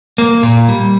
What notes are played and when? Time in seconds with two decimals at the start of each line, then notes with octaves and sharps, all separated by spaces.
0.18 A#3
0.43 A#2
0.69 G3